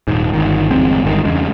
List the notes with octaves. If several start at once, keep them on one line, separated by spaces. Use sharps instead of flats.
D#1 G#2
G1 D#3
G1 E2 G#3 C4
G1 D#3
E2 C#3 G#3